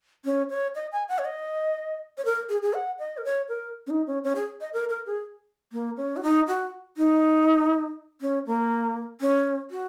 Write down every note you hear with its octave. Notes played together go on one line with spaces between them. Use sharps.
C#4
C#5
D#5
G#5
F#5
C#5
D#5
C#5
A#4
G#4
G#4
F#5
D#5
A#4
C#5
A#4
C#4
D#4
C#4
C#4
G#4
D#5
A#4
A#4
G#4
A#3
C#4
F#4
D#4
F#4
D#4
C#4
A#3
C#4
F#4